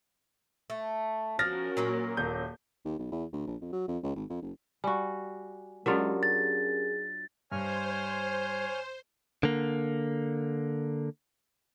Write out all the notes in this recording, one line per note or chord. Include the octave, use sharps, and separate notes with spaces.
A3
F3 C#4 F#4 A#4 F6 A6 A#6
A#2 F#3 A#3
D#1 G6
D#2
B1
E2
D2
A#1
F2
F#3
F2
C#2
G#1
F2
F#1
G3 F#4 G#5
F#3 G#3 C#4 D4 F4 G4 A#4
G#4 A6
G2 C5 C#5 G#5 F6
D3 A#3